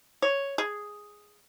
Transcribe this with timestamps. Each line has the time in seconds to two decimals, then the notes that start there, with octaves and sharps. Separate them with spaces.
0.22 C#5
0.58 G#4